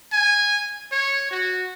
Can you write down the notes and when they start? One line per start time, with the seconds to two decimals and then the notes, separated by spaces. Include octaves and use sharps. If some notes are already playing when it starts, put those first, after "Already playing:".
0.13 G#5
0.92 C#5
1.31 F#4